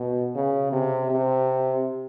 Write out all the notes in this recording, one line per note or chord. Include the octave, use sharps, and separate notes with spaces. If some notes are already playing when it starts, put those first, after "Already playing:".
Already playing: B2
C#3
C3
C3